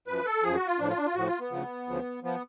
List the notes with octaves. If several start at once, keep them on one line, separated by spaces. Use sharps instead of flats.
F#2 F3 B4
A4
F#2 F3 G#4
F#4
F4
A2 F3 D4
F4
D4
F4
A2 F3 F#4
F4
B3
D2 C#3 F3
D2 C#3 F3
F3 B3